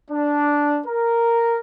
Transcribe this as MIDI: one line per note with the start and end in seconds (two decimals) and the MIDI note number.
0.11 0.80 62
0.87 1.59 70